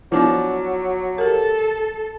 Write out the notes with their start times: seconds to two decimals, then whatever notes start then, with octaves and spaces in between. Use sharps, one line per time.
0.12 F3 F#3 B3 D4 E4
1.18 G4 A4 A#4